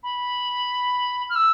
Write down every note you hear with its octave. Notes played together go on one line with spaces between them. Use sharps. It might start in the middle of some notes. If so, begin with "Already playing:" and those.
B5
F6
E6